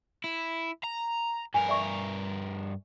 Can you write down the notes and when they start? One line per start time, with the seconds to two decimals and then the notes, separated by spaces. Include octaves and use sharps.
0.24 E4
0.84 A#5
1.54 G2 A#4 G#5
1.69 D5 E5 C#6